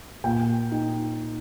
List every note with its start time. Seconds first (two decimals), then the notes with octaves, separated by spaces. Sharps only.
0.24 A#2 G5
0.72 D#4